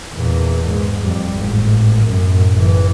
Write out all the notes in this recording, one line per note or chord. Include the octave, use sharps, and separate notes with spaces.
E2 A#2
G#2
F2 G3
G#1 A2
F#2 A2
F#1 E3